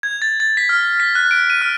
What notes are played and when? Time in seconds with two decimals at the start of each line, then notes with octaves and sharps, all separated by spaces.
0.03 G#6
0.22 A6
0.40 A6
0.57 B6
0.69 F6
1.00 B6
1.15 F#6
1.31 D7
1.50 D#7
1.62 F6